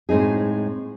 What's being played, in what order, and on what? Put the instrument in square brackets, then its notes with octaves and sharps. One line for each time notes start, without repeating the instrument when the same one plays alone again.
[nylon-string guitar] A2 G#3 C4 D#4 G#4